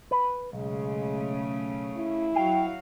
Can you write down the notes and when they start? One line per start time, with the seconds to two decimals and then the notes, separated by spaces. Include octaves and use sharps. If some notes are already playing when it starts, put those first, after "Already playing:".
0.11 B4
0.53 B1 C#3 G#3 A3
1.97 E4
2.35 F#3 F#4 F5 G5